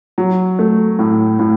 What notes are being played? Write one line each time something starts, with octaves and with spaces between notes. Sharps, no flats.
F#3
A3
A2
A2